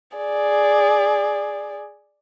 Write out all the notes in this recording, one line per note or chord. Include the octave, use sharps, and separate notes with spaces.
G#4 D5